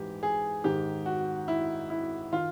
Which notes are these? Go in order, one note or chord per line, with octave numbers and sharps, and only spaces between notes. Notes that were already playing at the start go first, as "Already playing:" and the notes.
Already playing: G#2 E3 G4
G#4
G#2 D#3 G4
F#4
E4
E4
D#3 F4